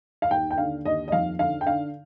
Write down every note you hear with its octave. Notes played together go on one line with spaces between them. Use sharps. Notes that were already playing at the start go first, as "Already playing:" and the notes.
F5
D#2 G5
G5
D3 F5
D#2 D#5
D#5
F2 F5
D3 F5
G5
D3 F5